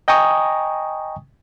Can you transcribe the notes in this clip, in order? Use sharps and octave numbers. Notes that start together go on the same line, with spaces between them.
D#5 G5 G#5 A#5 C#6 D#6